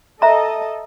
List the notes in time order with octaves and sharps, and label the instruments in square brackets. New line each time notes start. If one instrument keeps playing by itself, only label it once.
[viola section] A4 D#5 A5 [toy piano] E5 A#5